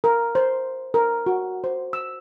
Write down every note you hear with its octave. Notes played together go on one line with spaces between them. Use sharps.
A#4
C5
A#4
F#4
C5
E6